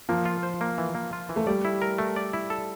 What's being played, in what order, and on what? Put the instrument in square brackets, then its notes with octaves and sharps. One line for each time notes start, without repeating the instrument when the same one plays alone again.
[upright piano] F3 [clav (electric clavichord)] A#3
[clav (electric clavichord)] F4
C5
A#3
E3
A#3
F4
E3
[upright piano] A3
[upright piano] G3 [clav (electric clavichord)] D5
[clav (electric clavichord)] E4
A#4
A3
D5
E4
A4